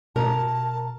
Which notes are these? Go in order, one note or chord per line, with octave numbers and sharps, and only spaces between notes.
B2 A#4 A5